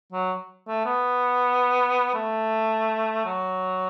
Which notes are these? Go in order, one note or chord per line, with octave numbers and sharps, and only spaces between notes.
F#3
A3
B3
A3
F#3